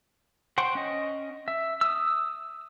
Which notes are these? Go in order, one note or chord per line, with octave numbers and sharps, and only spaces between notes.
C5 F#5 G5 C#6
C#4 D#5
E5
D#6 E6